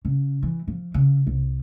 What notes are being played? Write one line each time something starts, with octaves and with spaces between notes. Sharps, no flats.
C#3
E3
F3
C#3
C2